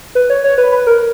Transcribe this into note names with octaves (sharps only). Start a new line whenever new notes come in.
B4
C#5
C#5
B4
B4
A#4